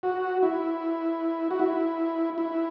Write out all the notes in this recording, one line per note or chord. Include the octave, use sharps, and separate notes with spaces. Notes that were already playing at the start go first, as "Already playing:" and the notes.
F#4
E4
F#4
E4
E4